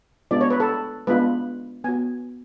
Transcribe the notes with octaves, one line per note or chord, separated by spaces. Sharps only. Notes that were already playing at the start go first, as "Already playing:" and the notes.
G#3 B3 D4 F4 D5
C#5
B4
A4
G#3 B3 D4 F4 B4
B3 F#4 G#5